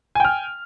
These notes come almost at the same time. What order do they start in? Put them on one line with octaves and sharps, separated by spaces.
G#5 G5 F6